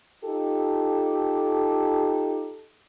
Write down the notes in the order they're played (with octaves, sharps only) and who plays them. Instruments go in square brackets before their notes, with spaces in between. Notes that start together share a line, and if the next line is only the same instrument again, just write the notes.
[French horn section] D#4 F4 G4 A4